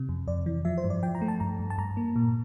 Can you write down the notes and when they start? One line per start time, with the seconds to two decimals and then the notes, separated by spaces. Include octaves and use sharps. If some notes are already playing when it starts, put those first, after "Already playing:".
Already playing: C3
0.09 F2
0.28 F2 D5
0.46 E3
0.65 F3 E5
0.78 C5
0.84 G2
0.90 D5
1.03 F3 G5
1.15 A#5
1.21 A3
1.28 A5
1.40 G2 A#5
1.59 G2
1.70 A5
1.78 G2 A#5
1.97 A#3
2.16 A#2